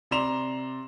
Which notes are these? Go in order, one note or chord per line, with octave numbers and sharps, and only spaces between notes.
C3 D5 A#5 C6 E7 F7